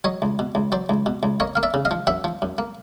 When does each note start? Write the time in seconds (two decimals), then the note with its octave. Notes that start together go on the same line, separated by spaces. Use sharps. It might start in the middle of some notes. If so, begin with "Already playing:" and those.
0.04 F#3 C#5 D#5
0.22 C#2
0.39 B2
0.55 C#2
0.72 F#3 C5 D5
0.89 C#2
1.06 B2
1.23 C#2
1.40 A#3 C#5 D#5
1.55 A#3 F5
1.63 D5 E5
1.74 C#3
1.85 D#5 F5
1.91 F3
2.07 F#2 E5 F#5
2.24 F3
2.42 F#2
2.58 A#3